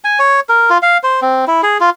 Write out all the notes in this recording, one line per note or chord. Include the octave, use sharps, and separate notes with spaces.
G#5
C#5
A#4
F4
F5
C5
C4
E4
G#4
F4